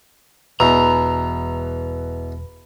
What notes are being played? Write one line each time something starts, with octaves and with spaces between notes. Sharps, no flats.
E1 E2 B2 B4 A#5 B5 E6